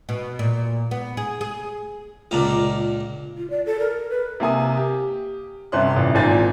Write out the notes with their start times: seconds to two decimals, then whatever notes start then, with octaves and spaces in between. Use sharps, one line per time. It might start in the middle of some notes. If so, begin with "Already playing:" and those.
0.09 B2
0.39 A#2
0.91 B3
1.17 G#4
1.41 G#4
2.31 C#2 A#2 D4
3.37 F4
3.50 D5
3.66 A4
3.79 A#4
4.10 B4
4.40 C3 A#3 G#5 D#6
4.77 G4
5.72 G1 C3 C#4 C5 C6 F#6
5.96 A1 A#2 E3
6.15 G#1 A#2 D#3 C4 G#5 A6